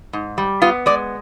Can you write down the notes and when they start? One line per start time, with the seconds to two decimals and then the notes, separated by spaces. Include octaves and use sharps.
0.13 G#2
0.38 G3
0.62 B3 F4
0.86 G#3 D5